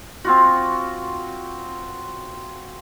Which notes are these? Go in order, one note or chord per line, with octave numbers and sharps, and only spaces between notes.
C4 F4 F#4